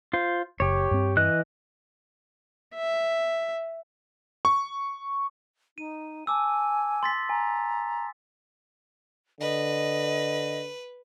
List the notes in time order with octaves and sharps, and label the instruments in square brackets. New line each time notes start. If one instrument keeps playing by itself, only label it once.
[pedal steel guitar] F4 C5
[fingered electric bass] F#1 [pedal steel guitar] G4 C#5
[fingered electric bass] G2 C4
[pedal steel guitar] E3 D#5 F#6
[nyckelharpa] E5
[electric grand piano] C#6
[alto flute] D#4 [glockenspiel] D#7
[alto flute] G#5 [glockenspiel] A5 D6 E6
[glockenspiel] C6 A6 B6
[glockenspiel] G#5 [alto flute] A#5
[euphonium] D3 [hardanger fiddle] B4 [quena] D#5